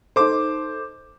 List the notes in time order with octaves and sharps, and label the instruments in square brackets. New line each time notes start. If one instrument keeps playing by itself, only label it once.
[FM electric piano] D#4 A4 [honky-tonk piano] C5 D6